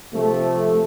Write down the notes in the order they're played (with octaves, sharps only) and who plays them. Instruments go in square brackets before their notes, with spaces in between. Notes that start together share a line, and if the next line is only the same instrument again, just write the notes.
[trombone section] C3 F3 A3